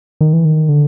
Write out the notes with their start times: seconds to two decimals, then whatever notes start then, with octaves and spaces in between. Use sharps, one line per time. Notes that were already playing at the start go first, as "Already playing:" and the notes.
0.21 D#3
0.33 E3
0.45 D#3
0.69 D3